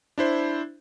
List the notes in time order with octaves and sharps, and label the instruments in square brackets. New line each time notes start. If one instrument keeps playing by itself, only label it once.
[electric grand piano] D4 E4 C5